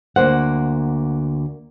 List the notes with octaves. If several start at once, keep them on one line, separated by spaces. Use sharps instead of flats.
D2 A#3 C5 F#5